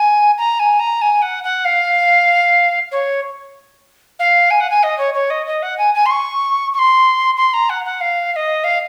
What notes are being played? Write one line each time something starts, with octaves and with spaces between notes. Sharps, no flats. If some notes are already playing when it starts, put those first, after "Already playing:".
Already playing: G#5
A#5
G#5
A#5
G#5
F#5
F#5
F5
C#5
F5
G#5
F#5
G#5
D#5
C#5
C#5
D#5
D#5
F#5
G#5
G#5
C6
C#6
C#6
C6
C6
A#5
F#5
F#5
F5
F5
D#5
F5